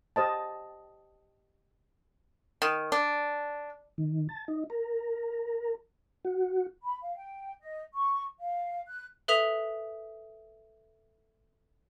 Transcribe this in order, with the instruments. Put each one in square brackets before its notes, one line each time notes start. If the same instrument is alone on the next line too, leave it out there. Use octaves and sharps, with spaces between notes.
[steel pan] G4 C5 D#5 A5
[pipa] D#3
D4
[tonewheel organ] D#3
A5
D#4
A#4
F#4
[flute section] B5
F5
G5
D#5
C#6
F5
F#6
[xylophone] A4 B4 E5 D#6 B6 F7